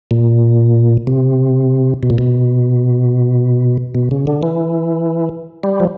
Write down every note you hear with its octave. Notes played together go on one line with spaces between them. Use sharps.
A#2
C3
B2
A#2
B2
B2
C#3
D3
E3
G3
F3